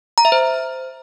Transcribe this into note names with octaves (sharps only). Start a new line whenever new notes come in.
A#5
E5
C5